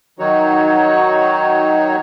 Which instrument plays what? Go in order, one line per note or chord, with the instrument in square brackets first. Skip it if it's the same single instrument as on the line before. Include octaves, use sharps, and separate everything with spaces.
[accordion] D#3 F#3 D#4 F#4 C#5